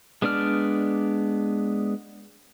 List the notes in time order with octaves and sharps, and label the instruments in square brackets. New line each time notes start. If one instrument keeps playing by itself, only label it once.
[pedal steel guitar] G#3 B3 D4 D5 F6